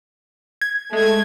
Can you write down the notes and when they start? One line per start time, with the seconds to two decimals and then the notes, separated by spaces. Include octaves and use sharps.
0.61 G#6
0.93 G#3 A3 G#6